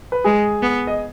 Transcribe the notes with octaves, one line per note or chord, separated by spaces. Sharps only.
B4
G#3 G#4
B3
D#5